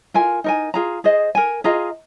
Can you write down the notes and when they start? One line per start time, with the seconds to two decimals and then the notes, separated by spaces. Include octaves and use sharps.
0.14 F4 A#4 G#5
0.44 D#4 A#4 G#5
0.74 F4 G#4 F5 A#5
1.04 G#4 C5 D#5
1.35 A#4 G#5
1.64 F4 G#4 D#5 A#5